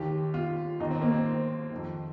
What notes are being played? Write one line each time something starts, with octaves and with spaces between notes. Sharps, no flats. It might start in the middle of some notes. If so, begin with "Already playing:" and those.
Already playing: D#2 D#3 G4
F4
D#2 D#3 D#4
C4
A#3
C4
F2 D#3